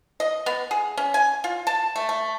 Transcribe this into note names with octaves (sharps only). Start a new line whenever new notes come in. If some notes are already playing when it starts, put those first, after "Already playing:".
D#5
B3
G#4
C#4
G#5
F4
A5
A3
A3